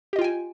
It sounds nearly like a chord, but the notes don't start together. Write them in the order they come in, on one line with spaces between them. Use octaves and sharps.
G4 D#5 F4 G5 G#5